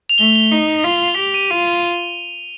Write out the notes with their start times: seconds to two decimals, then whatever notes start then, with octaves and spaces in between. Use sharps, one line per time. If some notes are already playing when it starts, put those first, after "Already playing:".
0.09 F7
0.18 A3 G7
0.36 G7
0.52 D#4
0.85 F4
1.18 G4 F7
1.34 D#7
1.51 F4